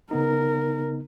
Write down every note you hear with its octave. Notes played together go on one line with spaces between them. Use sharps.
C#3 B3 D#4 A#4